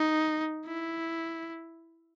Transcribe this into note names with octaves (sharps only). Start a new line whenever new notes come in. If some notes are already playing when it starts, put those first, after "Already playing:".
Already playing: D#4
E4